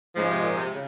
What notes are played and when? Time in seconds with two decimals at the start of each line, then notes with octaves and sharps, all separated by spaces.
0.16 G#2 C#3 F3 G#3
0.29 C3
0.42 A#2
0.56 C3
0.73 C#3